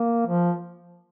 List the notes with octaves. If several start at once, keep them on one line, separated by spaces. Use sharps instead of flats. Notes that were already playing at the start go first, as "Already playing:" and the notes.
Already playing: A#3
F3